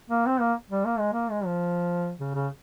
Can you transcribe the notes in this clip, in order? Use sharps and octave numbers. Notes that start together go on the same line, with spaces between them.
A#3
C4
A#3
G3
A#3
G#3
A#3
G#3
F3
C#3
C#3